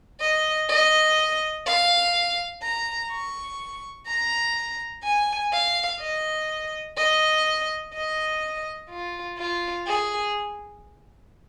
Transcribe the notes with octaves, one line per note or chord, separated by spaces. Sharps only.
D#5
D#5
F5
A#5
C#6
A#5
G#5
F5
D#5
D#5
D#5
F4
F4
G#4